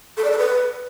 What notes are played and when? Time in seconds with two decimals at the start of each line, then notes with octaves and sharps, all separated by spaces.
0.17 A4
0.24 D5
0.31 A4
0.38 B4